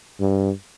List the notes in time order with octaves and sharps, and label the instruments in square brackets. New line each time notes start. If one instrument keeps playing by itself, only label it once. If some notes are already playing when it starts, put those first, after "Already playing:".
[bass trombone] G2